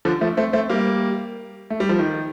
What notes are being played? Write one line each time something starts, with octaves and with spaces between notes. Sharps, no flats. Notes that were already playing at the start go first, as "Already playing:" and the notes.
D3 F3
F3 A3
A3 C4
A3 C4
G3 A#3
A3
G3
F3
D#3